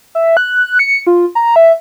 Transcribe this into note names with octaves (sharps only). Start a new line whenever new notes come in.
E5
F#6
C#7
F4
A#5
E5